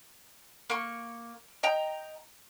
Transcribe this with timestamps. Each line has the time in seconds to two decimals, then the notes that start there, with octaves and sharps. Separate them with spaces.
0.70 A#3 C#6
1.63 D#5 G5 A#5